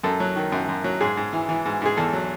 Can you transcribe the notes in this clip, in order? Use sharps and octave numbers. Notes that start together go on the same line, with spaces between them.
F#2 A4
F#3
D#3
F#2
F#2
F#3
G#2 G#4
G#2
E3
E3
G#2
G#2 G#4
E2 A4
F#3